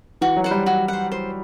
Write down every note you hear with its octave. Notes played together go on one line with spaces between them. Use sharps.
E3 F#4
F#3
C5 F#5
G3
F#4
C5 F#5
C5